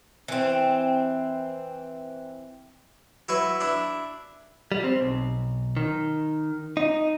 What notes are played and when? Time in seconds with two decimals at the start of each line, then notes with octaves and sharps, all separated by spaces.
0.28 E3 C4
3.29 F#3 E4 B4 C#6
3.61 D4 E4
4.72 G3
4.84 C4
5.01 B1
5.77 D#3
6.77 D#4